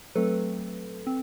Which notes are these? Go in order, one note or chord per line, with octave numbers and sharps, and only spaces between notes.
F#3 A3 C4 A4 B4
C4